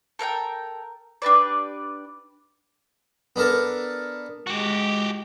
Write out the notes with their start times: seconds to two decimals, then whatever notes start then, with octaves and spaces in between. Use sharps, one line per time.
0.19 A4 A#4 F5 G5
1.22 D4 G4 B4 D5
3.36 B3 D4 A4 A#4 A5
4.47 G#3 F#4 G4